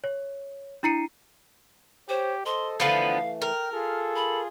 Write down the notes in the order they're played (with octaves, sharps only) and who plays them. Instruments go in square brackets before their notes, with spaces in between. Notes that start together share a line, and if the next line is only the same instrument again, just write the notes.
[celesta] C#5
D4 E4 A#5 C7 C#7 D#7
[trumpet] G4 [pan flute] C5 [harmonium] C#5
[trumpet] A4 [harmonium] C5 D#5 [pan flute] C6
[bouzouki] D3 F3 B3 [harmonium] E3 A3 [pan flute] F5
[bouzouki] A#4 [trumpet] G5 [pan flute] F6
[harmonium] F4 G#4 [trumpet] A4
[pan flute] B5